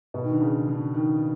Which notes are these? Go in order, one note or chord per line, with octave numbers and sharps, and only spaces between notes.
B2
D#3
D3
C#3
D3
D#3